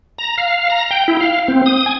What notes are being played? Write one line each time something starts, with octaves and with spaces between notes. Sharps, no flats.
A#5
F5
A#5
G5
E4
F5
C4
D#6
G#5